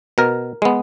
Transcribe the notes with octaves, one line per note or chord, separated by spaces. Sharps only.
B2 A#4
G#3 B3